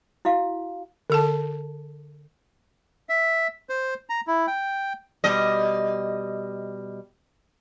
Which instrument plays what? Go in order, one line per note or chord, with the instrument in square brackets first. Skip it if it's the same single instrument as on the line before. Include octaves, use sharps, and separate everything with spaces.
[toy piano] E4 F#4 F5
[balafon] D3 A4 A5
[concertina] E5
C5
A#5
E4
G5
[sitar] B2 G3 D#5